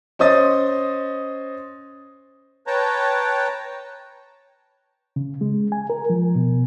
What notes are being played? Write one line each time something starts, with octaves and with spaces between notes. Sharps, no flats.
C#4 C5 D#5 D#6 A6
B4 C#5 G5 A5 A#5
C#3
G#3
G#5
A#4
F3
B2